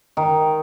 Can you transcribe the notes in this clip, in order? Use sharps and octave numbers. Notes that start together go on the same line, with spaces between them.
D#3